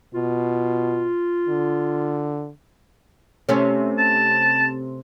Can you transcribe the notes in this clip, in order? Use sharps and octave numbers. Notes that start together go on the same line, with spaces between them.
B2 F4
D3
C3 A3 C#4
A5